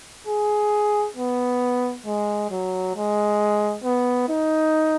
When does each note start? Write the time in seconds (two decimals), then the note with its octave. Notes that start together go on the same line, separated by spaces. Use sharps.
0.27 G#4
1.16 B3
2.06 G#3
2.50 F#3
2.95 G#3
3.84 B3
4.29 D#4